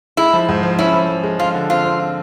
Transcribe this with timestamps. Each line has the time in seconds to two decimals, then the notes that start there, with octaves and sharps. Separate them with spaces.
0.17 G#3 E4
0.33 F3
0.49 G#2
0.63 F3
0.79 C#4 E4
0.93 F3
1.09 F3
1.24 G#3
1.39 F3 F4
1.54 D3
1.70 C4 F4
1.85 C4